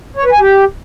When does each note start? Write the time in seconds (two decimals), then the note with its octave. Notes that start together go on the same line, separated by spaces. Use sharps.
0.17 C#5
0.24 B4
0.32 G#5
0.40 G4